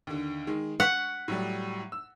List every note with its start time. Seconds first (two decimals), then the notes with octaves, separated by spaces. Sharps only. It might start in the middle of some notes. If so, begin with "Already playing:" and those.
0.07 D#2 D3
0.47 D#3 G#3
0.80 F#5 C#6 B6 C#7
1.28 A2 F#3 G3
1.92 E6